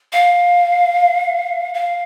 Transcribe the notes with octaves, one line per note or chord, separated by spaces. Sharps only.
F5
F5